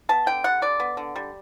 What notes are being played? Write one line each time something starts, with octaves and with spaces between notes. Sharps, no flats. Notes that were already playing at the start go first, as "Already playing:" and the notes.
B3 A5
D3 G5
G3 F#5
D3 D5
B3
D3
G3